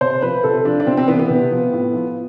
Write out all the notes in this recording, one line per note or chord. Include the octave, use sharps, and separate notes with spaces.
C3 C5
F3 B4
C3 A4
F3 D4
D4
C3 C4
C4
E3 B3
B3
C3
F3
A2
F3